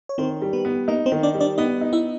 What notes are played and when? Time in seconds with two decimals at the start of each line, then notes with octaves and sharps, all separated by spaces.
0.09 C#5
0.18 D#3 C4 C5
0.42 G3
0.53 B3 B4
0.65 B3
0.88 A#3 D#4 A#4
1.06 C4 C5
1.12 D#3
1.23 D4 D5
1.34 G3
1.40 D4 D5
1.58 B3 D#4 D#5
1.81 D#4
1.93 E4 E5